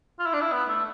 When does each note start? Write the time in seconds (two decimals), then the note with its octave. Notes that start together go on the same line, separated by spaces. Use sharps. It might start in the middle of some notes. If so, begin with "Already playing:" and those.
0.19 F4
0.26 E4
0.33 D4
0.41 E4
0.52 B3
0.69 A3